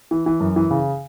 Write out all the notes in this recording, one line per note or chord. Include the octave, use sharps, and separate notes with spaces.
E3
E3
F#2
E3
C#3